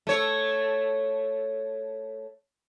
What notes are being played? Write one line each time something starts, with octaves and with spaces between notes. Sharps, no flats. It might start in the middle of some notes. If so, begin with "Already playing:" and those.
A3 C#5